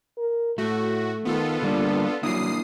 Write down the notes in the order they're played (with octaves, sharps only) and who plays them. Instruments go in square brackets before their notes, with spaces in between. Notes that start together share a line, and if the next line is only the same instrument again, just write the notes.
[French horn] A#4
[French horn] A2 [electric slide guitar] A3 [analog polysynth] F#4
[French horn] D#3 [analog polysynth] B3 F4 A4
[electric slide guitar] D3 G3 A#3 [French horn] D4
[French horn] F#3 [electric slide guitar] A#3 D4 E4 [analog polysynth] D#6 C7